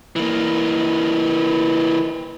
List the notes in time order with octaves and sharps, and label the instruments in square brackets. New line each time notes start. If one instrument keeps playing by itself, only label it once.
[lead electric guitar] E3 A#3